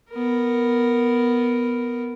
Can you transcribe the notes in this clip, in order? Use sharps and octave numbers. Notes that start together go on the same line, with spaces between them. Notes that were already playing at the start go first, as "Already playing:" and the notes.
B3 A#4